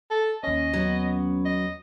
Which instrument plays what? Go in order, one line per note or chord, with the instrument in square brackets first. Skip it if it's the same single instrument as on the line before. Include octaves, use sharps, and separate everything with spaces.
[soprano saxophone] A4
[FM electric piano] D#2 C#4 [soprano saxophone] D#5
[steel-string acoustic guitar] F#3 B3
[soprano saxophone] D#5